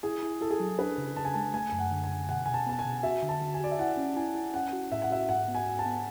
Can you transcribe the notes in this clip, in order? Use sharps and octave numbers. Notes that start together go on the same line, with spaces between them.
E4 G#4
E4
E4 A4
G#4
F#3 A4
D4 B4
C#3
C#3 A5
G#5
G#3 A5
A3 G#5
F#2
F#5
D3
G#5
D3
B2 F#5
B2 G#5
A5
B3 A5
G#5
B2
F#4 E5
D3
A5
D3
G#5
F#4 D5
E5
E4 F#5
C#4
E4 G#5
E4
C#4 F#5
F#4
A2 E5
F#5
F#4 E5
G#2 F#5
B3
G#5
G#2
A5
B3